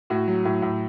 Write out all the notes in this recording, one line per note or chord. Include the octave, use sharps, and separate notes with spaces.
A2 F#4
F#3
A2
A2